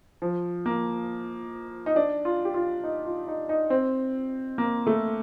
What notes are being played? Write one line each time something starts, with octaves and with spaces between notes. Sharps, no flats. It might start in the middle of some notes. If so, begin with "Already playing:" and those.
F3
A#3
D#4
D4
F4
G4
F4
D#4
F4
D#4
D#4
C4
A#3
A3